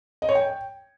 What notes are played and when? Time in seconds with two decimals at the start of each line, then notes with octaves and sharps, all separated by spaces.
0.22 D#5
0.29 C#5
0.35 G5